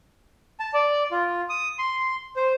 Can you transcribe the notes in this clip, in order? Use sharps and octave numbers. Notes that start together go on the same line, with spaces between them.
A5
D5
F4
D#6
C6
C5